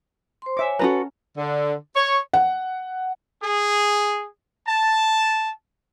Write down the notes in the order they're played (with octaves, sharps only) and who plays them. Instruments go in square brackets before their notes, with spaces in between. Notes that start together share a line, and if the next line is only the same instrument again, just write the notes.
[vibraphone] C5 C6
[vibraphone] C#5 G#5 [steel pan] E5 D6
[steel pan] C#4 A#5 [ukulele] F#4 A4 B4
[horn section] D3
C#5
[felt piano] F#5
[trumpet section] G#4
A5